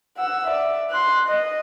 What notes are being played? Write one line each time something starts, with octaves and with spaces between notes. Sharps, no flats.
F#5 E6
D5 E5
C6 F#6
D#5